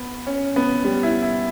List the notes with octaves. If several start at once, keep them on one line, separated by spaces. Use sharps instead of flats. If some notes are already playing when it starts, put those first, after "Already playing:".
Already playing: B3
C#4
B3
G3
E4
E4